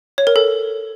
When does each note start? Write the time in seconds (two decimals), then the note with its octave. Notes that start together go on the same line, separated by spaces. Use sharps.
0.18 C#5
0.27 A#4
0.36 A4